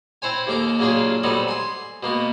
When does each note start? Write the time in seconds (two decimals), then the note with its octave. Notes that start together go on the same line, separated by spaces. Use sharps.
0.22 C4 E4 C5 C#5 G#5
0.47 D#2 A3 A#3 D6
0.79 C#3 F#3 A#3 D4 F4 G#4
1.23 F#3 G3 A3 B3 C4 D#4
1.48 G#5 C6
2.03 B2 A#3 B3